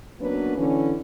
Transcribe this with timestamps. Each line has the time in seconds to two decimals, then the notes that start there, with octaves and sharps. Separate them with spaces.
0.20 F#3 A#3 B3 C#4 D4 B4
0.57 D3 E3 C#4